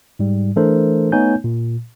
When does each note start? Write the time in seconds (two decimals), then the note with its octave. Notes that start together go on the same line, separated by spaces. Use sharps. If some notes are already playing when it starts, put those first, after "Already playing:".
0.19 G#2 G3
0.56 E3 A3 D4 A4 A#4 C5
1.12 A3 B3 D#4 C#5 G#5 G6
1.44 A#2